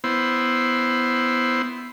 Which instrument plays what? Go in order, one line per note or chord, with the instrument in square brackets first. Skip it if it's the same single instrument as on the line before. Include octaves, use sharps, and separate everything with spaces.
[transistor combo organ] B3 E4 C5